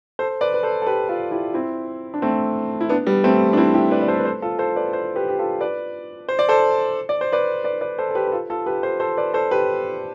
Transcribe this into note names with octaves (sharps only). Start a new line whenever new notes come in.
A4 C5
B4 D5
B4
A4 C5
A4
G4 B4
F4 A4
E4 G4
C4 E4
D4
A3 C4
E4
B3 D4
G3 B3
A3 C4
D4
C4 E4
E4 G4
B4 D5
D5
A4 C5
B4
A4 C5
F4 A4
A4 C5
B4 D5
A4 C5
G4 B4
G4
F4 A4
B4 D5
C5
D5
A4 C5
D5
C5
B4 D5
B4 D5
B4 D5
A4 C5
A4
G4 B4
B4
F4 A4
F4 A4
G4 B4
A4 C5
A4 C5
B4 D5
A4 C5
G4 B4